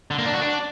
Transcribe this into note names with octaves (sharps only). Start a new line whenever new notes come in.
D3
A#3
D4
F#4
D4